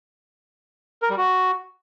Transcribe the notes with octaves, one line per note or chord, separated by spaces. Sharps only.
A#4
G3
F#4